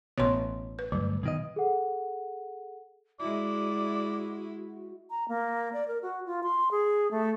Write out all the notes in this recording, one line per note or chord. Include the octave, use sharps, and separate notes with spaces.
A1 B2 C#5 C6
B4
D2 G2 F#3
B2 D#3 D#5
G#4 A4 F#5
G#3 E4 F#4 D5
A#5
A#3
D5
A#4
F#4
F4
C6
G#4
A3